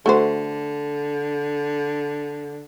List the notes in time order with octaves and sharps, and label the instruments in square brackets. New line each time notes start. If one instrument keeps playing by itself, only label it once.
[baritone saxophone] D3 [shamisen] A3 F#4 C5